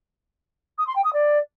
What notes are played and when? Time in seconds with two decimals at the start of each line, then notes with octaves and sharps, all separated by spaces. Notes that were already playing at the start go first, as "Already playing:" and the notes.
0.78 D#6
0.87 C6
0.96 G5
1.04 D#6
1.13 D5